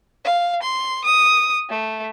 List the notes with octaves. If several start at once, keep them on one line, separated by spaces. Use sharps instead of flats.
F5
C6
D#6
A3